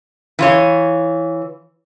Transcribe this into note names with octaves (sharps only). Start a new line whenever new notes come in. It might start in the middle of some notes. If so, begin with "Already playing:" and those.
E3 F4 C#5